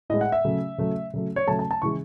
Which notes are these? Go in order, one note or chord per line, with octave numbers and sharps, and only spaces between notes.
A2 G#3 D#5
F#5
E5
C#3 F#3 A3
C#3 F#3 A3
C#3 F#3 A3
C#5
C#3 F#3 A3 A5
A5
A5
C#3 E3 G#3 C#6